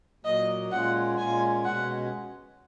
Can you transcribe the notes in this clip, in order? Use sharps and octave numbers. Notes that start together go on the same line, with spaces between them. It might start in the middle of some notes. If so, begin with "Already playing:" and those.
A#2 F#3 A#3 D#5
A#2 G#3 C#4 F4 F#5
A#2 G#3 C#4 F4 G#5
B2 G#3 C#4 F#5